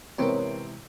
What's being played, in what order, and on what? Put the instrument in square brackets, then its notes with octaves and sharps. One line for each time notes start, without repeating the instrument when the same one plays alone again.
[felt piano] G#2 C3 E3 [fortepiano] B3 C4 [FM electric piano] A#4 C#5